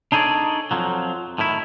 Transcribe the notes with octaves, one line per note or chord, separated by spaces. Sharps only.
D4 D#4 G#4 A4 C#5 D5
F2 F3 F#3
A2 D#3 E4